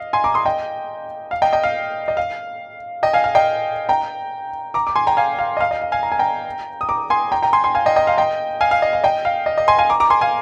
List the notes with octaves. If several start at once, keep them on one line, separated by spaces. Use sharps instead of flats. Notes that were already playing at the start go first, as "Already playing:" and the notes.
Already playing: D#5 F5
G#5 C6
A#5 D6
C6 D#6
D#5 G5
F5
D#5 G5
D#5 G5
F5
D#5
F5
D#5 G5
F5 G#5
F5
D#5 G5
G5 A#5
A#5 D6
D6
G#5 C6
G5 A#5
F5 G#5
F5
D#5
F5
D#5
F5
F5 G#5
A#5
G#5
G5 A#5
D#6
A#5 D6
G#5 C6
G5 A#5
G5 A#5
G#5 C6
G#5 C6
F5 G#5
D#5 G5
D#5 G5
F5
D#5 G5
F5 G#5
F5
D#5
F5
D#5 G5
F5
D#5
D#5
G#5 C6
F5 G#5
A#5 D6
A#5 D6
G#5 C6
F5 G#5